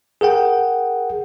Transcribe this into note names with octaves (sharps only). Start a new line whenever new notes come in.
G#4 A#4 F#5 G5